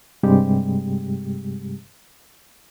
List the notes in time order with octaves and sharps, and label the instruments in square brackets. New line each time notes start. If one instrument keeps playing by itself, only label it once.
[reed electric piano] G2 C3 G3 G#3 G4